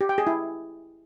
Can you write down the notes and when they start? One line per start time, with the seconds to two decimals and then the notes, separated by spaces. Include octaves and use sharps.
0.01 G4
0.09 G5
0.18 G#4
0.27 E4